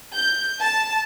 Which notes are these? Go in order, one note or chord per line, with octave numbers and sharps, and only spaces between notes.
G6
A5